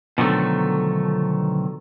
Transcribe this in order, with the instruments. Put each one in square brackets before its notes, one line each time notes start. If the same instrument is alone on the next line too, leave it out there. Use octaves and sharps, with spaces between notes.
[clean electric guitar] B2 D3 D#3 F3 F#3 A3